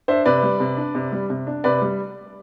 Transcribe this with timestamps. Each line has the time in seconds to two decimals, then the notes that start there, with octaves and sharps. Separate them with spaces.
0.08 D4 C5 E5
0.26 C3 B4 D5
0.43 G3
0.60 C3
0.77 D4
0.95 C3
1.12 G3
1.30 C3
1.47 D4
1.64 C3 B4 D5
1.82 G3